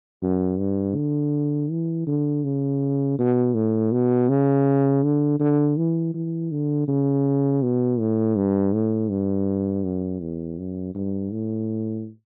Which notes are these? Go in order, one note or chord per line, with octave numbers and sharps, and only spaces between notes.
F#2
G2
D3
E3
D3
C#3
B2
A2
B2
C#3
D3
D3
E3
E3
D3
C#3
B2
A2
G2
A2
G2
F#2
E2
F#2
G2
A2